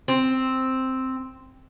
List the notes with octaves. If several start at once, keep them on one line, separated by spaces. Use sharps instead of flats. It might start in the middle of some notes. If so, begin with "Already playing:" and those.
C4